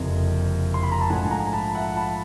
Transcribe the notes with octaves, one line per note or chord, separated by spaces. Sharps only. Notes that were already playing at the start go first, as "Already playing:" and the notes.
Already playing: F#1 F2 C3
C6
B5
A#5
A5
A#1 G#2 F3 A3 F#5 G#5
G#5 A#5
A5 B5
E5 F#5
A5 B5